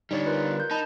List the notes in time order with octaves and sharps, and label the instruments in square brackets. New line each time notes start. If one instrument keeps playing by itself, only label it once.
[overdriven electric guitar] D3 G3 [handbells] D#4 C#5 D5
[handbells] F4 A#4 B4
A#4 G6
[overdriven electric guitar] D#4 [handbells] A5 B5